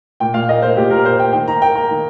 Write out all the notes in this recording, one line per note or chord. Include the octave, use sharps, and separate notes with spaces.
A#2 G5
A#2 F5
A#3 D#5
A#3 C5
A#2 G4
A#2 A#4
A#3 C5
A#3 G5
D#3 G5
D#3 A#5
A#3 G5
A#3 A#5
D#3